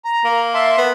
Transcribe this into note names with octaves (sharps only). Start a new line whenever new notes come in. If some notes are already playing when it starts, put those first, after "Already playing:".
A#5
A#3
E5 A5 C6
B3